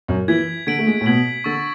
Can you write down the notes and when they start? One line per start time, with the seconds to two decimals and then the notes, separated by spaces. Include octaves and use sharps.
0.08 F#2
0.28 E3 G#6 B6 D7 F#7
0.67 D3 G#6 B6 D7 F#7
0.79 A3
0.87 G#3
1.01 A2
1.06 B2 G#6 B6 D7 F#7
1.44 D3 C#6 E6 A6 E7